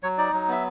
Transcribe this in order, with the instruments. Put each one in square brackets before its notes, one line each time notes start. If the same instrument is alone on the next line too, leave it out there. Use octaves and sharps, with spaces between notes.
[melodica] F#3 C#5
D#4 D5
F#3
B3 E5